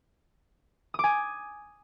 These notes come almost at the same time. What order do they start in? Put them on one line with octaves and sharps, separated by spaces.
D#6 D6 G#5